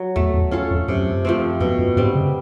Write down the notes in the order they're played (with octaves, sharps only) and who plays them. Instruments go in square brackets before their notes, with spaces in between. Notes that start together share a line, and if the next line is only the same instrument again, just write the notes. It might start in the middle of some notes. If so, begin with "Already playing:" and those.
Already playing: [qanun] F#3
[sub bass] E2 [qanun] A3
[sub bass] E2
[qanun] C#4 F4 A4
[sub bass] F2
[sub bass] F#2 [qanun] C3
[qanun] F3 A3 C4
[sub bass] F#2 [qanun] B2
[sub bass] F#2
[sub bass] G2 [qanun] G3 C4
[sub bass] C#3